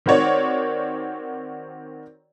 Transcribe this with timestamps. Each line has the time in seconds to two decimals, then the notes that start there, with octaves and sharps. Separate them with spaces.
0.06 D#3 C4 F#4 C#5 D5